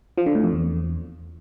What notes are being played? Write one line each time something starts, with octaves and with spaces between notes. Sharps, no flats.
F3
D3
A2
F2
E2